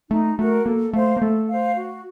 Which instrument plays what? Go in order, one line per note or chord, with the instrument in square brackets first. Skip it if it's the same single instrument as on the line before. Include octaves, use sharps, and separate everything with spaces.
[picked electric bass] A3 [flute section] D#4
[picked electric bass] A3 [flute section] F#4 A#4
[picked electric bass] A#3 [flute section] A4
[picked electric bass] A3 [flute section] C5 F5
[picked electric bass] A#3
[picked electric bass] A3 [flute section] A4
[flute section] C5 F5
F#4